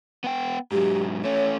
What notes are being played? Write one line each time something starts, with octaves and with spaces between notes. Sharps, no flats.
B3 G5
G#2 F#3 G4
A3 C#4 C#5